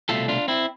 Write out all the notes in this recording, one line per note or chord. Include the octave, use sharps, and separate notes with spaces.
C2 B2 A3 F4 A4
D4 F4
C4 E4